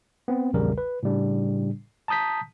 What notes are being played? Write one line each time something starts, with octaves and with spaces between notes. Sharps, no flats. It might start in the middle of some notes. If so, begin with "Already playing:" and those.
B3 C4
A#1 E2 C#3 G3 A#4
B4
A2 C#3 G3 D4
A5 A#5 D#6 G6 B6